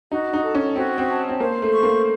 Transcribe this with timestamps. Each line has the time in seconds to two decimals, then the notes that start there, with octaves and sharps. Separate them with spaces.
0.12 D#4 F#4
0.33 D#4
0.44 A4
0.55 C#4
0.76 C4 F#4
0.98 C4
1.08 A5
1.29 C4
1.40 A#3 C5
1.62 A3
1.72 C#6
1.83 A#3